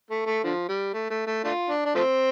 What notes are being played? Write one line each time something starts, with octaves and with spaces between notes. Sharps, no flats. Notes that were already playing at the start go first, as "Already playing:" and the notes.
A3
A3
D3 F3
G3
A3
A3
A3
A3 D4 F4
D4
D4
F3 A3 C4